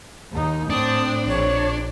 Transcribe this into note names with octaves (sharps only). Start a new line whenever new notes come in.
D#2 D#4
A2 C4 D4 D#6
A#1 C#5